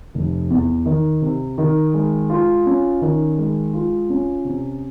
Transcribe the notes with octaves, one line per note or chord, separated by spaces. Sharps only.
F1
E2
D#3
C3
D#3
G#3
F4
C#4
D#3
G#3
F4
C#4
C3